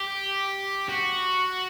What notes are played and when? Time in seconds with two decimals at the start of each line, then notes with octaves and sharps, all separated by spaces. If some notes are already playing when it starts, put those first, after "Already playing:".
Already playing: G4
0.89 F#4